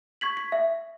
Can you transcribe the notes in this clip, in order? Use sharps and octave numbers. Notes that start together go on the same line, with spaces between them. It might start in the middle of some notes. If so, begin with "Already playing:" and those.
C#6 G#6 B6 F#7
B6
E5